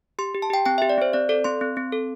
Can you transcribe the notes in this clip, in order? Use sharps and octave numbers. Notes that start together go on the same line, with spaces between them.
G4 C6
G4
A5
G4 G5
C4 G5
G4 E5
D5
C4 C5
C4 D5
A4 D5
C4 C6
C4
C4
A4